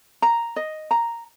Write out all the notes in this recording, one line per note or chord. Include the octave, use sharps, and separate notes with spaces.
A#5
D#5
A#5